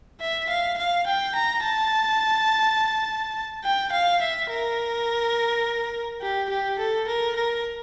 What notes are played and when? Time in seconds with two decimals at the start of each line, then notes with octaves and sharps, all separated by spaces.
0.21 E5
0.49 F5
0.78 F5
1.06 G5
1.35 A#5
1.64 A5
3.64 G5
3.92 F5
4.21 E5
4.50 A#4
6.21 G4
6.50 G4
6.79 A4
7.07 A#4
7.36 A#4